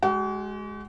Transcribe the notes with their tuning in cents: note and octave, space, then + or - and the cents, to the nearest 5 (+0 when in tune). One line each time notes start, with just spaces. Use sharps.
G#3 +10 F#4 +45